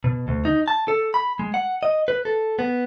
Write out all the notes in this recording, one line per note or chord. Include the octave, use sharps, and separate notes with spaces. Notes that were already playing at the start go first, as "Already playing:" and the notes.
B2
D2
D#4
A5
A4
B5
G#3
F#5
D#5
B4
A4
B3